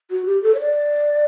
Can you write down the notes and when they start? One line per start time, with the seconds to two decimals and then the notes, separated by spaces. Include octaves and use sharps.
0.11 F#4
0.26 G4
0.43 A4
0.54 C#5
0.60 D5